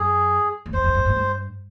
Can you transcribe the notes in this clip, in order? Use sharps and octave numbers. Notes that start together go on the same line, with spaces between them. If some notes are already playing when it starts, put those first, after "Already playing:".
Already playing: F#2 G#4
E2
F2 C5
F2
F#2
G2
G2